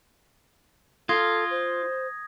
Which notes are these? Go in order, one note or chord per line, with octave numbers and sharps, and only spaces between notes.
F4 A4 D#6 G#6 A#6
C5